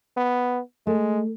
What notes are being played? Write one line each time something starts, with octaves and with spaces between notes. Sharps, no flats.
B3
G#3 A3